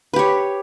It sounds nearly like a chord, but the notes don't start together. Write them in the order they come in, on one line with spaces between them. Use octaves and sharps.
B4 G4 C#5